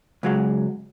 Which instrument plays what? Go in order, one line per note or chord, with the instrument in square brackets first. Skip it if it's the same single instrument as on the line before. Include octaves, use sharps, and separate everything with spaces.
[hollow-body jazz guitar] C#2 F#3 G#3